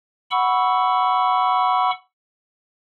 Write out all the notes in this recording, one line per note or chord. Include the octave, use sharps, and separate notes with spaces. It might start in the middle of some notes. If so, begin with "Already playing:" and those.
F#5 B5 C#6 E6